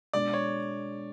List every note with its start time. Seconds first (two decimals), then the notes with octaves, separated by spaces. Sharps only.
0.13 B2 G#3 D4 D5
0.34 C#5